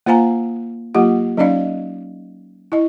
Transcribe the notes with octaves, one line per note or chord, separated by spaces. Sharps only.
A#3 F4 C5 F5 G#5 A#5
F#3 A#3 F4 G4 F#5
F#3 C#4 D#4 D5 D#5 F5
E4 D#5